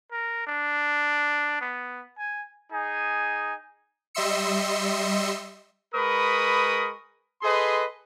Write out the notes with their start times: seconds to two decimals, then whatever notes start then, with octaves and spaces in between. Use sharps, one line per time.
0.12 A#4
0.47 D4
1.61 B3
2.18 G#5
2.72 D#4 G#4 G#5
4.15 G3 D#5 E5 C6 E6 C#7
5.95 G#3 A#4 B4 B5 C#6 D#6
7.42 G#4 A4 B4 D#5 C6